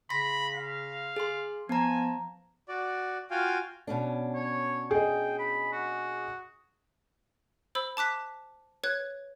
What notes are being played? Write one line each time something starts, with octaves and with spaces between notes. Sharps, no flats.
C#3 B5 C6 A#6 B6
F5
G#4 C6
F3 B3 G#5 A#5
F#4 D5
F4 F#4 F5 G5 G#5
B2 C#4 D4
C#5
G#4 D#5 G5
B5
F#4
C5 B5 E6
A5 D6 F#6 B6
B4 C#5 F#6 G#6